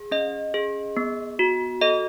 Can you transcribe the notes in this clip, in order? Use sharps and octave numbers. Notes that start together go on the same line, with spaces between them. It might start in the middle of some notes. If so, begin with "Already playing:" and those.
Already playing: G#4
C#4 D#5
G#4
B3
F#4
A4 D#5